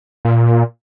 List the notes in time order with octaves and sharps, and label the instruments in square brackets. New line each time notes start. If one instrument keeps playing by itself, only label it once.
[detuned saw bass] A#2